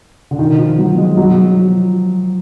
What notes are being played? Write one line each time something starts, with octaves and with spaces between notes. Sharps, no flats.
D3
D#3
F3
F#3
G#3
F#3
F3